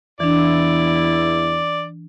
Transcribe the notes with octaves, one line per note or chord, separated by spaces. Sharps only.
E2 E3 D4 E4 D5